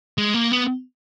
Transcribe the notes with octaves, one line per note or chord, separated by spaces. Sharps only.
G#3
A#3
B3